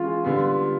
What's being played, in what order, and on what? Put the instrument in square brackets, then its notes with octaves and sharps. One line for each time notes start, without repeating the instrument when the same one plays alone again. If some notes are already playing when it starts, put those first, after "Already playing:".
Already playing: [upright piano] E3 G#3 C#4 [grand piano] F4
[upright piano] D3 G3 B3